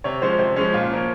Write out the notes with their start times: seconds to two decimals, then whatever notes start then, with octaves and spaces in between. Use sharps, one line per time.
0.04 C3 C#5
0.22 F3 G#3 C#4 C5
0.39 C3 C5
0.56 F3 G#3 C#4
0.74 A#2 F4
0.91 F3 A#3 C#4